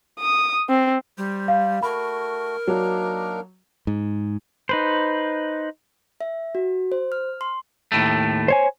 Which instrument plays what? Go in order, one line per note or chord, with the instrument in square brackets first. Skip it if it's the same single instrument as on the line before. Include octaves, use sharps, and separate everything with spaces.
[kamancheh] D#6
C4
[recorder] G3 [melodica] C5
[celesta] F5
[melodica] A3 F#4 [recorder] A#4 [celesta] B5
[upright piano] F#3 [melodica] A#3 D4 D#4
[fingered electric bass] G#2
[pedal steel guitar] D#4 B4 C5
[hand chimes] E5
F#4
C5
F6
C6
[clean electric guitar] D#2 A2 A3
[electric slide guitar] C5 C#5 G#5